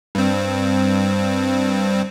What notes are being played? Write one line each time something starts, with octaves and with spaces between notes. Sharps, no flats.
G2 C4